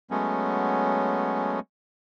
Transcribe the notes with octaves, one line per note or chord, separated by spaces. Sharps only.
F#3 G#3 A3 B3 C#4